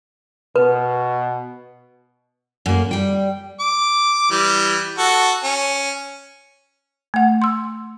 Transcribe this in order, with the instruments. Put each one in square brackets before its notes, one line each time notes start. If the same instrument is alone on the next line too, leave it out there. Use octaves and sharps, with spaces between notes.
[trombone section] B2 [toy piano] B4
[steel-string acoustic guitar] F#2 A#3
G3 G5
[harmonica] D6
E3 G3
F#4 A4
C#4
[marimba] A3 F#5
C6 E6